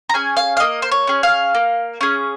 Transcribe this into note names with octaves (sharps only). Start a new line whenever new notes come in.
A#5
C#4 G#4 G#5
F5
F5
A#3 D#5
C5
C#5
C#4 G#4
F5
A#3
C#4 G#4